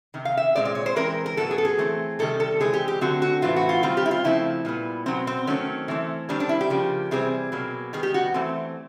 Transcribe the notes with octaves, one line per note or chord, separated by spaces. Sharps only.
C3 D#3
F5
E5
A#2 F3 G#3 C4 D5
D5
C#5
C5
E3 G#3 C4 A#4
A#4
A2 F#3 B3 A4
G#4
A4
G#4
E3 A3 C4
C3 D#3 G3 A4
A4
E3 G#3 C4 G#4
G4
G4
D3 F#3 A3 C4 F#4
F#4
A2 E3 A3 C4 F4
F#4
F4
D#3 G3 C4 F4
G4
E4
F4
C#3 F3 A3 C4 E4
A#2 G3 B3
B2 F#3 A#3 C4
C4
D#3 F#3 A3 C4 C#4
E3 A3 C4
D#3 G3 C4 D4
D4
E4
G4
C#3 F3 A#3
C3 E3 G3 C4 G#4
B2 F#3 A#3
D#3 G3 B3 G#4
G4
F#4
E3 A3 C4